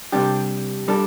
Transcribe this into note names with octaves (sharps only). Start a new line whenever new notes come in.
C3 G3 D4 G4
G3 D4 A4